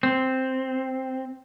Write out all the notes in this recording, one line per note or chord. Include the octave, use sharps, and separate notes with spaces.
C4